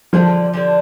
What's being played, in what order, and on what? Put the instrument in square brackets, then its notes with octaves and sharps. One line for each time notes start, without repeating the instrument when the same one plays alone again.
[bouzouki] D3 G3 D4 [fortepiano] F3
[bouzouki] D3 G3 D4